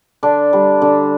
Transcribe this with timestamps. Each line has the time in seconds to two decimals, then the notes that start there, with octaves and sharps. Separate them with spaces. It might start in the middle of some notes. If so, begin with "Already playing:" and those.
0.23 D3 D4
0.53 G3
0.82 D3